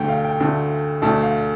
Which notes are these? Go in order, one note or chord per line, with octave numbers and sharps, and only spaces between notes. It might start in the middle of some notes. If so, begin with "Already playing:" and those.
Already playing: D2 D3 A3 G5
F5
G5
D2 D3 A3
D2 D3 A3 A5
F5